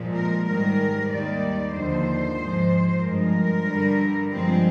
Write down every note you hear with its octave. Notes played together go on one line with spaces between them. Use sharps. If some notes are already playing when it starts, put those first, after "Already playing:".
Already playing: A#2 F3 G#3
A#4
G#2 D#3 G3 A#4
D#2 D#3 G3 D5
D#2 D3 F3 C5
G#2 F3 G#3
G2 F3 G#3 A#4
G2 D3 G3
G2 F3 G#3 C4